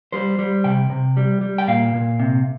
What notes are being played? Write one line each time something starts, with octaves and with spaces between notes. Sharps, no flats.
G3 C5
G3
C3 G5
C3
G3
G3
G5
A#2 F5
A#2
C3